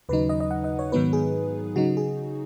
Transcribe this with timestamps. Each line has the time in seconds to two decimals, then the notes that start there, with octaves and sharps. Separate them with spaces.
0.09 D#2 C#3 F#3 D#4 B4
0.29 D#5
0.40 D#5
0.51 F#5
0.64 D#5
0.79 C#5
0.92 G#2 D#3 F#3 B3 D#4 B4
1.13 G#4
1.76 C#3 F#3 D#4 F#4
1.97 G#4